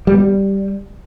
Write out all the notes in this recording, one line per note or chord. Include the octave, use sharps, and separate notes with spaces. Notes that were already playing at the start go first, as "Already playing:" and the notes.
G3
B3
G3